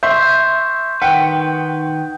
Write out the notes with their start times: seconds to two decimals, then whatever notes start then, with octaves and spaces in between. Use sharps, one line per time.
0.03 E5 C6 C#6 G6
1.02 D#3 B4 F#5 G5